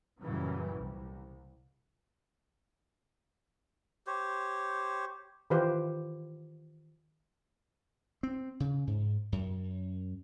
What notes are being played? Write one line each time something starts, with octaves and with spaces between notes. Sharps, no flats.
F#2 A#2 C#3 E3 F#3 G3
C2
G4 C5 C#5
D#3 E3 F4 G4 B4 C5
C4
C#3
G#2
F#2